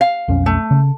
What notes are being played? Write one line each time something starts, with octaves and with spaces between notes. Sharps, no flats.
F5
B1 F2 C#4
A3
C#3